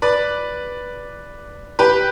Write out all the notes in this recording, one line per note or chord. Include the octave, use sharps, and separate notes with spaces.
B4 D5
G4 B4